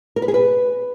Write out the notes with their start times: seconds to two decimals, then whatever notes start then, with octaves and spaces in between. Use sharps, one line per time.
0.16 A#4
0.22 B4
0.28 G#4
0.34 B4